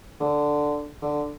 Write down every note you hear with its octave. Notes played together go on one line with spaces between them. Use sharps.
D3
D3